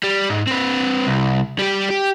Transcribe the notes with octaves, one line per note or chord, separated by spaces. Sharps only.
G3
G#2
C4 B4
C2
G3 G4
G4